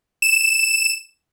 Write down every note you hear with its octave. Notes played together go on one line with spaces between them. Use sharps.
E7